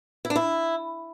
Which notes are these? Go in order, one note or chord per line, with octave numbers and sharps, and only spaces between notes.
E4
D4
E4